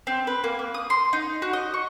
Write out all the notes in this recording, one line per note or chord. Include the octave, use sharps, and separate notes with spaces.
C4
B4
A#3
A#3
D#6
C6
D#4
F#4
D#5
C#6